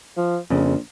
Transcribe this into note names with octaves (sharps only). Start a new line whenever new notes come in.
F3
A#1 F2 C#3